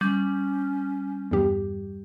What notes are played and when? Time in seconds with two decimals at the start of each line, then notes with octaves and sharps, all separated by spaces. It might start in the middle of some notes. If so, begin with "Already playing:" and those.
0.01 G3 C#4
1.31 E2 G2 G4